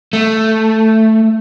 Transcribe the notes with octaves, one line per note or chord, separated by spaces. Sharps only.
A3